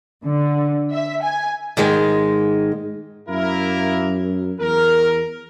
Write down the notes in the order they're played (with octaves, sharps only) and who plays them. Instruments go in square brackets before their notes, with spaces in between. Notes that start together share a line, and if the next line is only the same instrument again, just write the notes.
[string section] D3
E5
G#5
[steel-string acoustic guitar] G#2 D#3 G#3
[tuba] F#2 [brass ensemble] A#3 E4 A#4
[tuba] E2 [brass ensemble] A#4